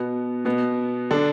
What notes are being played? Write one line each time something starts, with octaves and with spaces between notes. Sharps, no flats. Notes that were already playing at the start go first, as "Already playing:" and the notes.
Already playing: B2 B3
B2 B3
D3 D4